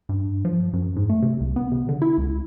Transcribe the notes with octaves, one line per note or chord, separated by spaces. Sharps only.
G2
F3
F#2
G#2
A3
C3
C2
B3
C3
D3
E4
C#2